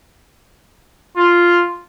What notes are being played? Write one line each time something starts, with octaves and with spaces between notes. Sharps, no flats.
F4